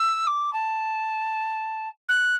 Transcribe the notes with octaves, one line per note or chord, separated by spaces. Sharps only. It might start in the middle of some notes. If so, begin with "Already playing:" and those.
Already playing: E6
D6
A5
F#6